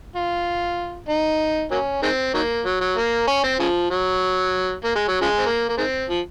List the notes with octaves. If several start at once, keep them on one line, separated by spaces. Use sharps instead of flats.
F4
D#4
F#3 A#3 C#4
D#3 G#3 C4
D#3 F#3 A#3
F#3
F#3
A#3
C#4
C4
C#3 F3
F#3
A#3
G#3
F#3
C#3 F3 G#3
C4
A#3
A#3
D#3 G#3 C4
F3